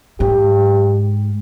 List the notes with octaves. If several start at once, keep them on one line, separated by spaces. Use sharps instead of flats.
G#2 G4